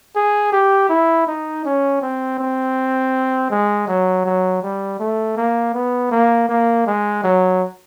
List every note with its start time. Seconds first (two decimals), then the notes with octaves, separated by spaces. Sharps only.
0.16 G#4
0.53 G4
0.90 E4
1.27 D#4
1.65 C#4
2.02 C4
2.39 C4
3.50 G#3
3.88 F#3
4.26 F#3
4.63 G3
5.00 A3
5.37 A#3
5.74 B3
6.11 A#3
6.49 A#3
6.87 G#3
7.24 F#3